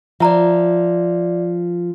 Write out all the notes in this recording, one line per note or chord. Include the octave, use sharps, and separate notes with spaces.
F3 F4 D5 E5 A#5